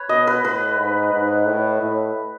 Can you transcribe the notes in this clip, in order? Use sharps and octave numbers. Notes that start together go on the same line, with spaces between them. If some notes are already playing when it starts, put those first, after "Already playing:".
Already playing: B4 C#5
B2 D#5
B4
A2 B4
G#2
G#2
A2
A2